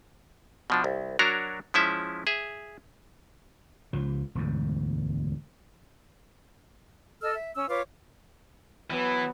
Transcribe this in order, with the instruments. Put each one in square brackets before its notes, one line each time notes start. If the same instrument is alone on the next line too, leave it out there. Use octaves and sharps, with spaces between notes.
[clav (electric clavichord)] B2 F3 D4
C2
F#3 D4 F#4 A#4 C#5 A#5
F3 G#3 C#4 E4 E5
G#4 E5
[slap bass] C#2 F3
E1 D2 G#2
[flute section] A4 D#5 E6 F6
E5
C#4 E6
F4 B4 C#5 D6
[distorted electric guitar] E3 [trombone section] F#3 B3